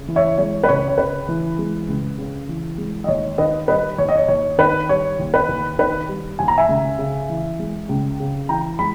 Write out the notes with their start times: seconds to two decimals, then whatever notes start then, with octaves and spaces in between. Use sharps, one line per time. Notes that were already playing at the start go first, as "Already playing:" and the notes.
Already playing: C#3
0.08 E3
0.16 C#5 E5
0.38 G#3 C#5
0.64 B4
0.68 C#2 C#5
0.88 C#5
0.98 C#3 B4
1.29 E3
1.58 G#3
1.88 C#2
2.18 C#3
2.49 E3
2.78 G#3
3.04 D#5
3.08 D#2 C#5
3.38 D#3 B4 D#5
3.68 G3 B4 D#5
3.98 D#2 C#5
4.09 D#5
4.17 C#5
4.28 D#2 C#5
4.58 D#3 B4
4.89 G3 C#5
5.19 D#2
5.34 B4
5.49 D#2
5.78 D#3 B4
6.09 G3
6.39 D#2 G#5
6.48 A#5
6.58 E5 G#5
6.69 C#2
6.99 C#3
7.30 E3
7.59 G#3
7.89 C#2
8.20 C#3
8.49 E3 G5 A#5
8.79 G#3 B5